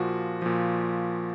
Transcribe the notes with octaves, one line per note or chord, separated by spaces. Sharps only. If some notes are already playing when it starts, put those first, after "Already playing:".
Already playing: A#2 F3 F#4
A#2 F3